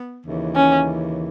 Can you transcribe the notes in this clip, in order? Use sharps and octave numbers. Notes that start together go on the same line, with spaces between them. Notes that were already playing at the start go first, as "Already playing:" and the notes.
Already playing: B3
D#2 C#3 E3
C#4